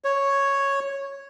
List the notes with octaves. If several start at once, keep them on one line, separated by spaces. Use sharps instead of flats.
C#5